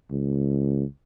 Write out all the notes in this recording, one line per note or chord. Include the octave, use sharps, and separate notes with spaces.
C#2